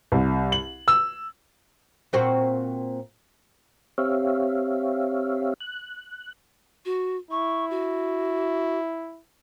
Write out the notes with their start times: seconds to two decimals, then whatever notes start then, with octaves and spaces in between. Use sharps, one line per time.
0.12 C2
0.52 F#7
0.88 E6
2.13 A#2 C4 F#4
3.98 C4 G4 C#5 E5 F5
5.61 F#6
6.85 F#4
7.31 E4 C#6
7.70 F#4